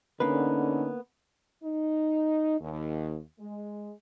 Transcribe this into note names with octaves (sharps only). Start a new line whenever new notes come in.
D3 A#3 B3 C#4 D#4 B4
D#4
D#2
G#3